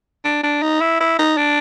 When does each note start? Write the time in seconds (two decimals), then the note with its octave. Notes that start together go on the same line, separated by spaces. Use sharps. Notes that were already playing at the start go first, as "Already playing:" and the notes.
0.24 D4
0.44 D4
0.62 D#4
0.81 E4
1.00 E4
1.19 D#4
1.37 D4